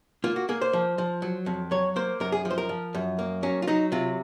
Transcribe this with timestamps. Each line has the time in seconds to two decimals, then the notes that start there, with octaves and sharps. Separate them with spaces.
0.24 A#3 F4
0.36 F#4
0.49 A#3 G#4
0.62 C5
0.73 F3
0.98 F3
1.22 F#3
1.46 F2
1.71 F#3 C#5
1.96 A#3 C5
2.20 F#2 A#4
2.32 G#4
2.45 F3
2.51 C5
2.58 A#4
2.69 F3
2.95 F#2
3.19 A#3
3.43 F#3 C#4
3.62 F4
3.67 F#3 D#4
3.92 C3 F4